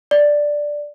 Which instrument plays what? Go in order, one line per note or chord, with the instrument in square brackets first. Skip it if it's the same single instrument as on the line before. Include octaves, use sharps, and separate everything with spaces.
[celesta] D5